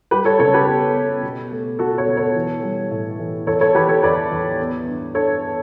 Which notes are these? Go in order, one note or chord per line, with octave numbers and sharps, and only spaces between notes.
G3 G4 B4
A4 C#5
C#3 A4 C#5
G4 B4
B3
B3
B2
A3
B2 F#4 A4
A4 C#5
B2
A4 C#5
E3
G3
A2
E3
E2 A4 C#5
A4 C#5
E2 G4 B4
A4 C#5
E2 B4 D5
E2
B3
G2
G2 A4 C#5